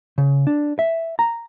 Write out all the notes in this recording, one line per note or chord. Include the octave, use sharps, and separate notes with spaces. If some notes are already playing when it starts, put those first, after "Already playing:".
C#3
D4
E5
A#5